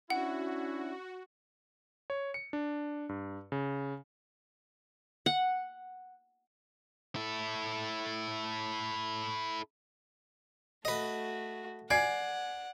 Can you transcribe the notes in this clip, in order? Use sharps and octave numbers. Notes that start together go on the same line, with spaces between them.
C#4 D4 E4 F#4 F#5
C#5
C#7
D4
G2
C#3
F#5
E4 A4
A3 F#4 B4 D#5
D5 F#5 G#5 G#6 C7